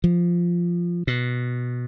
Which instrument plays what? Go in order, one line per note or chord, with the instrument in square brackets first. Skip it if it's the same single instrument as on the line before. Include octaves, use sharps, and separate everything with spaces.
[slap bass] F3
B2